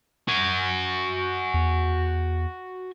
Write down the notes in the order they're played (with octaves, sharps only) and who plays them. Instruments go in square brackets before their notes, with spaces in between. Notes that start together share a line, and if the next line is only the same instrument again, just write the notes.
[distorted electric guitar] F#4 G#5
[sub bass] E2